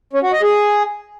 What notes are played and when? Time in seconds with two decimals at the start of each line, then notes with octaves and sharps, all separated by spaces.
0.13 C#4
0.23 F#4
0.32 D#5
0.42 G#4